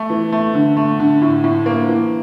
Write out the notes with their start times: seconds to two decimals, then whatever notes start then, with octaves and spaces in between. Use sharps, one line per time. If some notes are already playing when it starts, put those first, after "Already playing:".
Already playing: A3
0.10 E3
0.32 A3
0.55 D3
0.77 A3
1.00 D3
1.22 A2
1.44 A2
1.66 A#3
1.89 E3